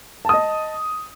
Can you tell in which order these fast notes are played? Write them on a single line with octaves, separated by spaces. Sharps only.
A5 D#6 D#5